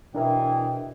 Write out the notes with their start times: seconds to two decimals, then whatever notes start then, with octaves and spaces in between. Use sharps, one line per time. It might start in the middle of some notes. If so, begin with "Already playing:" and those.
0.15 B2 E3 C4 D4 G#4 A#4 E5 G5